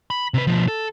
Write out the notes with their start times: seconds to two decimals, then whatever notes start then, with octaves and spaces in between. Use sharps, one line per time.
0.10 B5
0.34 C3 B4
0.47 B2 F3
0.68 A4